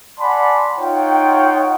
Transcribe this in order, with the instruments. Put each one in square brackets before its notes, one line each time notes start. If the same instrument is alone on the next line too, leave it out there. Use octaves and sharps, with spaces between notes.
[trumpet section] D5 F#5 G#5 A5 B5 C6
D#4 F4 C#5 F#5 G5